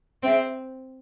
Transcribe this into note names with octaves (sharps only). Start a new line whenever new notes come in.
C4 G#4 C5 E5 G5